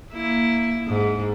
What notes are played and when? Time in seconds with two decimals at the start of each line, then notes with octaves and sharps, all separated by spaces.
0.13 A#3 E4
0.87 G#2